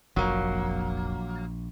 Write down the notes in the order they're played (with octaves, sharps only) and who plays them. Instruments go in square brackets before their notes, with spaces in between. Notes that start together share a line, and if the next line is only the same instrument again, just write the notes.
[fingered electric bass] F1 [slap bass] A#1 [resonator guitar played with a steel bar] F#3 A#3